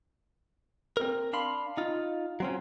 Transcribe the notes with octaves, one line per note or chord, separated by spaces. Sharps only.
C4 A#4
D4 F5 B5 C6
D#4 F4
F#3 C4 C#4